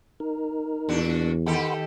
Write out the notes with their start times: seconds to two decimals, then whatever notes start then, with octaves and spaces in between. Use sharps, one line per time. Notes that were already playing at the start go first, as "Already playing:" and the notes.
0.20 D#4 A#4
0.89 E2 A#2 D4 F#4
1.46 D#3 G4 A4 F#5 B5 C6